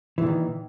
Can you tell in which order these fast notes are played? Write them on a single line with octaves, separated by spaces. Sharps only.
E3 A#2 D#3